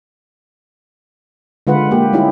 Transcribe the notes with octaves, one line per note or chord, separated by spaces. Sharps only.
D3 G#3 F4 B4 F#5
A#3 G4
G3 C#4 D#4 E4 G4